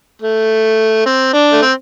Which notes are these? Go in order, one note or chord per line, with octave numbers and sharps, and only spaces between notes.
A3
C4
D4
A3
C4